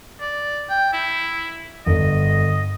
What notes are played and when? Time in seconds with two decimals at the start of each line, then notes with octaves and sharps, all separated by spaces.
0.20 D5
0.70 G5
0.93 E4
1.86 G1 D#5